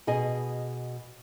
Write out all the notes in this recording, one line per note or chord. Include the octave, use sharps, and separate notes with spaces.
B2 G#4 D#5 G#5